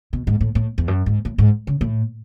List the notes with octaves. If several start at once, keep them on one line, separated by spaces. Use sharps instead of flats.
B2
G#2
A2
A2
E2
F#2
G#2
A2
G#2
C#3
A2